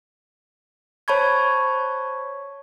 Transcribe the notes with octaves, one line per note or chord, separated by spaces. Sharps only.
C5 C#5 A5 B5 C#6 G#6